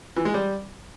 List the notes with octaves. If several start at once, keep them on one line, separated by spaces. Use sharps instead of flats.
E3
G#3
G3